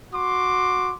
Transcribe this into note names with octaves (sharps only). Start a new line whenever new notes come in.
F#4 C6 D6